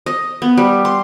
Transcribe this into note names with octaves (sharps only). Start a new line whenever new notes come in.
D#5
B3
G3
C6